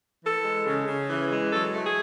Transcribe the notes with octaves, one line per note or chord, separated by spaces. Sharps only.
E3 A4
G#3
C#3
C#3
E3
G#3
F#3 A4
A3
G#4